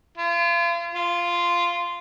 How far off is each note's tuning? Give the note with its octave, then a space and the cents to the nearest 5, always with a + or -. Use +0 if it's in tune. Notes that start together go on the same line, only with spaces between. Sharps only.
F4 -40
F4 -10